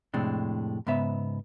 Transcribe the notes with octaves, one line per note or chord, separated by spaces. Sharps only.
F2 A2 C3 G#3 D4
G#2 C#3 B3 E5